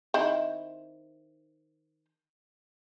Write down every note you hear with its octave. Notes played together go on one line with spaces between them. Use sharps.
D#3 C4 E4